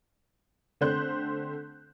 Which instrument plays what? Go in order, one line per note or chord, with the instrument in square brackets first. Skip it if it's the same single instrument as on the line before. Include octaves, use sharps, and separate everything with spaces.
[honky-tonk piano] D3 A3 C4 C5 F#6 G6